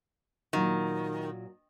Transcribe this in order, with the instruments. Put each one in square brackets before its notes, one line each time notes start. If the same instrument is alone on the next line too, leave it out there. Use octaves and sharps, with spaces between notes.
[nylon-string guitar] A#2 F#3 F#4 [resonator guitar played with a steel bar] D#3